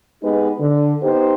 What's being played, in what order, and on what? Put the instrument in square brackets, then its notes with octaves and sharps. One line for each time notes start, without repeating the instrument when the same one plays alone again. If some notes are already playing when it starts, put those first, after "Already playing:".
[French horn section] G#3 B3 D#4 G4 B4
D3
B3 D#4 G4 C5